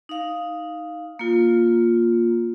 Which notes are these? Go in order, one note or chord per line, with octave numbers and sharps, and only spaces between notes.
D#4 F5
A#3 F4